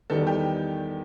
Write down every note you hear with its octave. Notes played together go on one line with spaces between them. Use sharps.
E2 D#3 G3 A4
G4